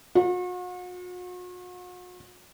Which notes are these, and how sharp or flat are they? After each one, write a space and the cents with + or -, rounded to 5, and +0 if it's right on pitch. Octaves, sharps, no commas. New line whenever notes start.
F#4 -45